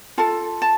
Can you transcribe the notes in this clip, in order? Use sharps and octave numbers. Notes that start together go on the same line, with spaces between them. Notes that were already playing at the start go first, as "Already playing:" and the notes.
F4 A4 A5
A5